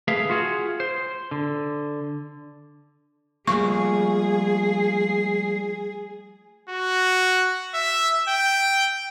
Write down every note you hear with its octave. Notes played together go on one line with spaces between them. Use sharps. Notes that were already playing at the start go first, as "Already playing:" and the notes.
A3 G#4 B4 E5 F5
F4 F#4 G#4
C5
D3
F3 G3 A3 A#3 G#4 C#6
F#4
E5
G5